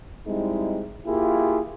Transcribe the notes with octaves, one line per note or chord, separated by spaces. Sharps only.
G3 G#3 C4 D#4 E4
A#3 E4 F4 G4 G#4